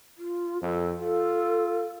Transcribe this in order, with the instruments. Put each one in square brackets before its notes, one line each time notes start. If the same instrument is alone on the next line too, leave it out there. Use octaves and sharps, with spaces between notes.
[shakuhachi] F4
[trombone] F2 [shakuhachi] A4
[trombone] F4 [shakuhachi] A4